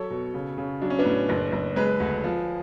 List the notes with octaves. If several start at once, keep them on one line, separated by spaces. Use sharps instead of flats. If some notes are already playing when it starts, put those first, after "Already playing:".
Already playing: F#3 A4 C#5
B2
C#3
C#3
F#3 D4
C#4
B3 D4
A2
F#1
F#1
G#3 G#4 B4
D2
F3